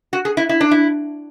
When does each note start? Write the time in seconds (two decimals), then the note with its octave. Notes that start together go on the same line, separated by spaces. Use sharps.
0.13 F#4
0.25 G#4
0.37 E4
0.49 E4
0.61 D4
0.71 E4